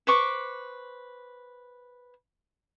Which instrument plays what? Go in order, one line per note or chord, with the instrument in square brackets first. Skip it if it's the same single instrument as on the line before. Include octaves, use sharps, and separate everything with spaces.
[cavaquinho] B4 C5 C#6 D6